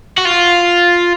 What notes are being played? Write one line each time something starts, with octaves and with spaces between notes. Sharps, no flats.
F#4
F4